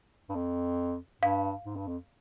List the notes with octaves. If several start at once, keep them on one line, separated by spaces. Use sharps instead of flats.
G2
F2
G2 F5
G#2
G2
F2